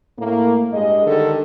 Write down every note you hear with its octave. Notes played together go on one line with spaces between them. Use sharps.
A2 A#3
G2 G#3 D#5
D3 D#3 G3 A4